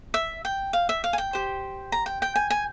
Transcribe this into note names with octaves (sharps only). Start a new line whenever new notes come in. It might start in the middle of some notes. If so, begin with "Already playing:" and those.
E5
G5
F5
E5
F5
G#5
G5
G4 C5
A#5
G5
G5
G#5
G#5